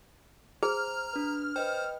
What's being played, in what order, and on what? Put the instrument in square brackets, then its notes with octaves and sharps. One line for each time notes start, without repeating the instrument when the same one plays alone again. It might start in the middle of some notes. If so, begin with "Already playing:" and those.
[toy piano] G#4 [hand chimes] C5 [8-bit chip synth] A#5 [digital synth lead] F6
[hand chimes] D4 B4
[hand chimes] B4 D#5 G5 [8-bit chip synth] C5